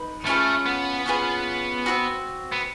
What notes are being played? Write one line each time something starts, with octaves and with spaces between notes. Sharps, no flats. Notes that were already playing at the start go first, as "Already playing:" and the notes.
Already playing: D#4 B4
A3 C#4 F4 G#4 B4
B3
C#4 F4 G#4 B4
C4 D#4 F#4
B3